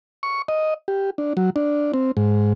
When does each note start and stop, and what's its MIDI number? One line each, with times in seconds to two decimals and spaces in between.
0.23 0.42 85
0.48 0.74 75
0.88 1.10 67
1.18 1.33 62
1.37 1.50 54
1.56 1.92 62
1.94 2.11 60
2.17 2.53 44